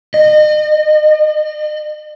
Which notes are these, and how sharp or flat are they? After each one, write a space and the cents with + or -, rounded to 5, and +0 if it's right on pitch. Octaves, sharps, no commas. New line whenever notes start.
D#5 -35